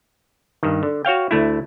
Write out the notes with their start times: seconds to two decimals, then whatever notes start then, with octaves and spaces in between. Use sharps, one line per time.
0.63 G2 D#3
0.83 D3
1.05 F#4 C#5 F5 G5
1.31 D2 A3 E4